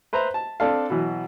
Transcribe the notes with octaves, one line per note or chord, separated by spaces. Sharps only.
B4 C5 E5 A#5
A5
C4 D4 A4 F5
B2 E3 F#3